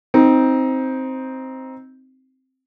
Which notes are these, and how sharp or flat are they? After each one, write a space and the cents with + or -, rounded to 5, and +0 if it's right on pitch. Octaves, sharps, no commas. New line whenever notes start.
C4 +0 D#4 +15